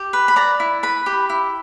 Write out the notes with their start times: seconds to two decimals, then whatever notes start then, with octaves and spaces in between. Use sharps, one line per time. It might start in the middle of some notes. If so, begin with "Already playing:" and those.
Already playing: G4
0.13 B4
0.28 B5
0.36 D5 A#5
0.60 E4
0.83 B4 B5
1.06 G4
1.30 E4